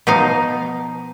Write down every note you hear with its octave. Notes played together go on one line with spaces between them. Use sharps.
B2 F3 D#4 F5